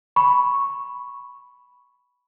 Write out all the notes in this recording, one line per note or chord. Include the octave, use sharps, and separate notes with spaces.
B5 C#6